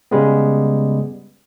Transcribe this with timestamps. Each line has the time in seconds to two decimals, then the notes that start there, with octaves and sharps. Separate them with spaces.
0.11 C#3 G3 G#3 B3